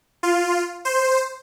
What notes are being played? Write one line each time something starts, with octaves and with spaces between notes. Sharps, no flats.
F4
C5